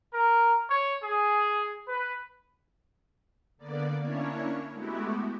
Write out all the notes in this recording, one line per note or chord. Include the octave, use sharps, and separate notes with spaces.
A#4
C#5
G#4
B4
D3 A#3 B3 D5
A#3 C#4 D4 E4 C#5
G#3 A3 B3 E4 F#4 G4